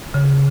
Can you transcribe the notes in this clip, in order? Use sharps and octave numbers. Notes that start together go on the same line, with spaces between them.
C#3